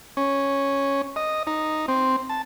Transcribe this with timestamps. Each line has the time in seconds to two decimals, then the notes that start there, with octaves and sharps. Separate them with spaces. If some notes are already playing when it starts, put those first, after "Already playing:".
0.17 C#4
1.16 D#5
1.47 D#4
1.88 C4
2.30 A5